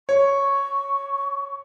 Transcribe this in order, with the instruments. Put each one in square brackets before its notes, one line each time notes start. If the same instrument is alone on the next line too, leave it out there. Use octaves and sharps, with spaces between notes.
[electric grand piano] C#5 [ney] C#6